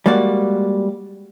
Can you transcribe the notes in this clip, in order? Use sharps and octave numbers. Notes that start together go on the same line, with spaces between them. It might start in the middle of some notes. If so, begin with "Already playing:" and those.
G3 G#3 A#3 F#4 D5